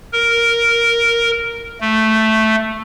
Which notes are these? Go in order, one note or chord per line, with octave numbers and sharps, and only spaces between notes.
A#4
A3